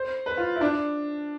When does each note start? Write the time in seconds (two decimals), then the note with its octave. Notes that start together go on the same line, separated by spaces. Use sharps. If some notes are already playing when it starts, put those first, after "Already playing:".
Already playing: C5
0.26 B4
0.37 F4
0.56 E4
0.61 D4